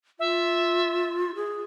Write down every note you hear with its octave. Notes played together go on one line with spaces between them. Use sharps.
F4 E5
G#4